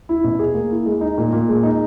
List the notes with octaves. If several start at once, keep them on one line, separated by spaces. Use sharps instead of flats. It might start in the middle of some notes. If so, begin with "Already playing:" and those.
E4
B2
G#4
A#3
E4
G#3
D#4
A#2
A#2
G#3
D#4